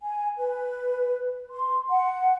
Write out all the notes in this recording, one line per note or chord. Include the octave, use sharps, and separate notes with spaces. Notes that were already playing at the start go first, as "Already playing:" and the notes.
G#5
B4
C6
F#5